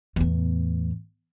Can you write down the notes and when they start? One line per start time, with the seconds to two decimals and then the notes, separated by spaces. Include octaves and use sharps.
0.16 E2 A2